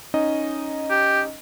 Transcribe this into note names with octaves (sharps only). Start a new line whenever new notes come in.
C#4 D#4 D#5
G4